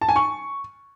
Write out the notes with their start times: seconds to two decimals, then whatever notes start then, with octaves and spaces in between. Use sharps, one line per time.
0.01 A5
0.09 G#5
0.16 C#6